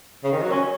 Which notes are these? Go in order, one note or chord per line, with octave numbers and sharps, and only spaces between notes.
C#3
D#3
F#3
C#4